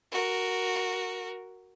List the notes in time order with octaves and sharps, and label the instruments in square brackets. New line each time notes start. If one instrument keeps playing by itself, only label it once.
[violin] F#4 A#4